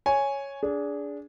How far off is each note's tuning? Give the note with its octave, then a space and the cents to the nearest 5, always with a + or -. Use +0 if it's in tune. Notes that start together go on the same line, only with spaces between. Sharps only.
C#5 +0 G#5 +0
D4 -20 G#4 +0